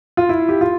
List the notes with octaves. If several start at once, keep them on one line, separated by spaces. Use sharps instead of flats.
F4
E4
G4
F4